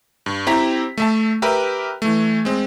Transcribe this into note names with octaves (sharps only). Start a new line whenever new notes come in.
G2
C4 E4 G4 A#5 B6
A3 E5 A5
G4 A#4 B4 E5
E3 A3
G#3 C4